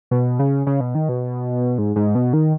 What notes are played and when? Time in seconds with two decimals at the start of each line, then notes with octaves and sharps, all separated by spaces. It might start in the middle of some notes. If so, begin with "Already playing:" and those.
0.11 B2
0.39 C#3
0.67 C#3
0.81 B2
0.95 D#3
1.09 B2
1.78 G#2
1.96 G#2
2.15 B2
2.33 D#3